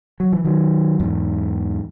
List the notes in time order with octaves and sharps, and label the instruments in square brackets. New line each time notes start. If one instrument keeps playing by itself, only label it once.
[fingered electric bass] F#3
E3
D#3 F#3
E2 G#2